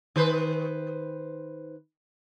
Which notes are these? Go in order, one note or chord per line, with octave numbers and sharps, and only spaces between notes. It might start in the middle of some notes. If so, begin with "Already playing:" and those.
D#3 B4 C5